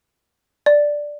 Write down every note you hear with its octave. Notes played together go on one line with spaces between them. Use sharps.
D5